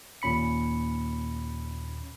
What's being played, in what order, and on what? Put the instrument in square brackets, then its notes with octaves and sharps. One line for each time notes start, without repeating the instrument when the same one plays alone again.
[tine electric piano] D#2 A#2 C#4 B5 C#7